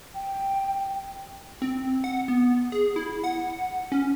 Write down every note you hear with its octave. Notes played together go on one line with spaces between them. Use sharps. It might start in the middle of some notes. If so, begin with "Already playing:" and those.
G5
C4
F#5
B3
G#4
E4
F#5
C#4